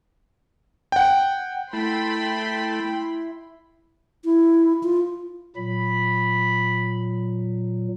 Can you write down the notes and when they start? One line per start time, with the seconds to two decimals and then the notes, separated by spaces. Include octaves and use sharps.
0.92 F#5 G5
1.73 A3 E4 G5 B5 C6
4.25 E4
4.83 F4
5.56 A#2 F#3 B5